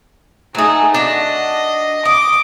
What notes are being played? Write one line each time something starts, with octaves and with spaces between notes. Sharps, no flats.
F#3 A3 D#4 G#4
D4 F#4 D#5
D#5 D6